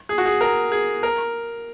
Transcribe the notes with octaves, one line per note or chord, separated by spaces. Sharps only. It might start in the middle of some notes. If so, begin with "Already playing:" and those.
G#4
F#4
G#4
A#4
G#4
A#4